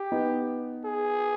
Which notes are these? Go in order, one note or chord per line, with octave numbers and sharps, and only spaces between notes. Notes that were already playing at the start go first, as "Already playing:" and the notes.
Already playing: G4
B3 D#4
G#4